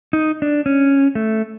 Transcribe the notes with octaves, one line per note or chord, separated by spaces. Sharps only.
D#4
D4
C#4
A3